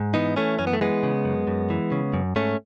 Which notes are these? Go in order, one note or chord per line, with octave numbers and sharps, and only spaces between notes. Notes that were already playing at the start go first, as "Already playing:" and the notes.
Already playing: G#2
E3 B3 D#4
E3 A3 C#4
F#2 C#4
B3
A3
E3 G#3 B3
C#3
F#2
F#2
E3
C#3
F#2
G#2 A3 C#4